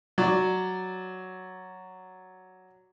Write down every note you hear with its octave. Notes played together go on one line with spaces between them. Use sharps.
F#3 D5